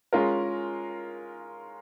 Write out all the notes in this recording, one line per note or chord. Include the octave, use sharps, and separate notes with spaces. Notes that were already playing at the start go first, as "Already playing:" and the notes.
G#3 C#4 F4 A#4